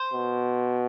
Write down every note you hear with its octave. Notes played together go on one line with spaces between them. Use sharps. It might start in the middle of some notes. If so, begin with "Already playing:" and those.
Already playing: C5
B2